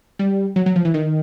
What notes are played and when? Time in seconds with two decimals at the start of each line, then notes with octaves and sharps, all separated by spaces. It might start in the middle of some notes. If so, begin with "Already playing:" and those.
0.19 G3
0.56 F#3
0.66 F#3
0.76 F3
0.85 E3
0.94 D#3